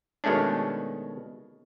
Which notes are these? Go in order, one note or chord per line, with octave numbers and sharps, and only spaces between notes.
B2 D#3 G#3 A3 C#4 D4